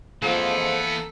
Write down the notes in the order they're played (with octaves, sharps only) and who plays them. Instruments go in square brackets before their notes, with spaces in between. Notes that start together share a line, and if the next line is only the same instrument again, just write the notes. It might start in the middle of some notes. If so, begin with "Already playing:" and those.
[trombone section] F2 G#2 F3 [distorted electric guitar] E3 B3 [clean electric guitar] A#3 [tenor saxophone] A4